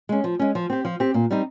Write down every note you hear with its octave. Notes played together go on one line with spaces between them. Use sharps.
G#3 C#4
F3
G#3 C#4
F3
C4 G4
F3
C4 G4
A#2
G3 C4 D#4